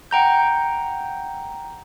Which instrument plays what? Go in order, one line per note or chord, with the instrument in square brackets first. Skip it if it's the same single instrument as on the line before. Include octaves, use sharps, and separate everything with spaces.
[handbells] F#5 G5 A#5 G6